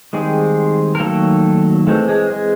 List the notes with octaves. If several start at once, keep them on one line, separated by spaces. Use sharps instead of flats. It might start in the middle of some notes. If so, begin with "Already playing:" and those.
D#3 G3 G#3 C4 G#4
A#4
D#3 F#3 A3 A#3 A4
E3 G#3 A3 C4 A4
G#3 G#4
G#3 G#4